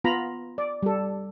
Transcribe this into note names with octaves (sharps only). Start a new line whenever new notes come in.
B3 F4 A#5 B5
D5
G3 A4